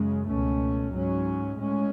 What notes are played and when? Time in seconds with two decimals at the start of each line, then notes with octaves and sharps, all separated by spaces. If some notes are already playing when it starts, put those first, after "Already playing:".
Already playing: F#2 C#3 G#3
0.28 C#2 B2 A3 C#4
0.93 G#2 F#3 C#4
1.59 A2 G#3 C#4